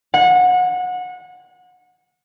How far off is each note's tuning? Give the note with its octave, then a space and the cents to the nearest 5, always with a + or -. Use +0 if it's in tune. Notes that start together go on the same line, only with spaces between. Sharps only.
F#5 -25